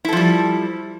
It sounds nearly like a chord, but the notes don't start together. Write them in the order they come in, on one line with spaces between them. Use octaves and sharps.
E4 A4 F3 G3